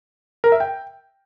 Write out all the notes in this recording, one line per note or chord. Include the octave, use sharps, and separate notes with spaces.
A#4
E5
G5